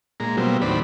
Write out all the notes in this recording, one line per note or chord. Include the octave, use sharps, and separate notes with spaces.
A#2 G#3 A#5
B2 F#3 G3 A#3 C4
D#2 A2 F#3 C4 D5 B5